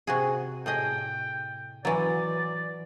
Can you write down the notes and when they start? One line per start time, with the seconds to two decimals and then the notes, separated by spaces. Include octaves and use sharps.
0.07 C3 F#4 G#4
0.66 A2 G#4 D#5 G5
1.85 E3 F#3 D5